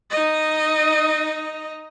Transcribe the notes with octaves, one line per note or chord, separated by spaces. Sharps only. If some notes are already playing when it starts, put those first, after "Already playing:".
D#4 D#5